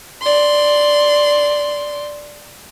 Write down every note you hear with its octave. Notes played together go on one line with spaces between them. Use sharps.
D5 C6